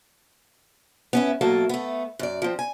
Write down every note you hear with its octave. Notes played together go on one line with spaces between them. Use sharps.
B3 C#4 E4
B2 F#3 A3 A#3 A4
A3 B3
F#2 D5
F3 C4
G#5